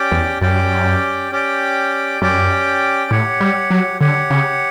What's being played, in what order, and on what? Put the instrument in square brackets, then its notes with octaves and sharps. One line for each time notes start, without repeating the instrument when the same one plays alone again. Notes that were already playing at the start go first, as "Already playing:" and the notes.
Already playing: [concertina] C#4 G4 D5 G5
[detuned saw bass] E2
[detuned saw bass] F#2 [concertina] C#4 G4 D5 G5
[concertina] C#4 G4 D5 G5
[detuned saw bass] F#2 [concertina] C#4 G4 D5 G5
[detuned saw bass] A2 [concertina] G4 C#5 F#5
[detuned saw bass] G3
F#3
[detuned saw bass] D3 [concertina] G4 C#5 F#5
[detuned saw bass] C#3